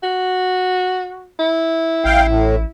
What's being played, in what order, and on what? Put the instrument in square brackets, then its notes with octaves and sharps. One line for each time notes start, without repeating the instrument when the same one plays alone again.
[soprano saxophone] F#4
E4
[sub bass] A1 [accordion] F5 G5
[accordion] A2